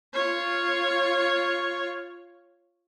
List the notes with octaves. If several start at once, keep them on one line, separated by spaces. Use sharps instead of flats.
F4 C#5